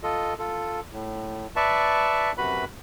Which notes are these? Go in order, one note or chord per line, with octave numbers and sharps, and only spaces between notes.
F4 A4 D#5
F4 A4
A2
B4 D5 E5 A5 C#6
F#2 C3 F#4 B4 B5